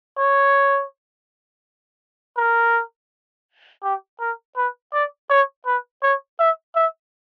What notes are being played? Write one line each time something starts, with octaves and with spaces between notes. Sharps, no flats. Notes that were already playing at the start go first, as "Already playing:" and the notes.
C#5
A#4
G4
A#4
B4
D5
C#5
B4
C#5
E5
E5